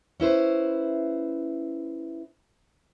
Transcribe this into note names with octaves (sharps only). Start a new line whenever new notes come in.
C#4 E4 B4 C5